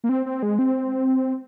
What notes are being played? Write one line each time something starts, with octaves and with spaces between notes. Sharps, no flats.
A#3
C4
C4
G#3
C4